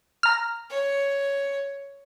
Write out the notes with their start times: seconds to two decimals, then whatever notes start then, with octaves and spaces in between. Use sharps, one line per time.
0.23 A#5 F6
0.70 C#5